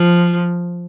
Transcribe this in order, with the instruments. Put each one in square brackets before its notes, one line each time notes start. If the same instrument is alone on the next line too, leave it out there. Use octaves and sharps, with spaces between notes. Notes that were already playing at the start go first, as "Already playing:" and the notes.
Already playing: [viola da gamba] F3